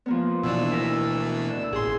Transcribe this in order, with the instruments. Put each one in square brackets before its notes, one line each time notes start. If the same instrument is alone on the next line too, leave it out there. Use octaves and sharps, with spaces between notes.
[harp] F3 A#3 B3
[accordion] D2 E6 [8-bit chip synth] B2 E3 D4
[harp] E4 A#4
[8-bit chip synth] A1 C6 [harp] G#4